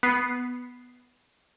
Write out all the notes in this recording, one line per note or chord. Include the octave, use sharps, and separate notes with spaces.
B3 C7